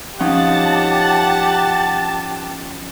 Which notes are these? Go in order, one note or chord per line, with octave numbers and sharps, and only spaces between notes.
F3 C#4 D#4 G4 F#5 A5 A6